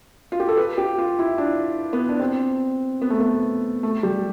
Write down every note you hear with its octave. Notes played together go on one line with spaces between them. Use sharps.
F4
G4
A4
B4
G4
F4
E4
D4
B3
D4
C4
B3
A3
B3
A3
G3